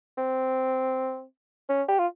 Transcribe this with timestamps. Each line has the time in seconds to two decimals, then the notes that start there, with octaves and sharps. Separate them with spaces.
0.18 C4
1.69 C#4
1.88 G4
1.99 F4